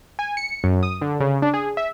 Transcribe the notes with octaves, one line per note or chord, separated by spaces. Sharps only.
G#5
C#7
F#2
D#6
D3
C#3
D4
G#4
E5